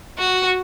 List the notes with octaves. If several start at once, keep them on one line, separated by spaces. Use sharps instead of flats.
F#4